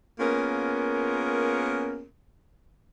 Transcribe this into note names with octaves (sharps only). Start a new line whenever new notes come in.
A#3 B3 C#4 F4 G#4 A#4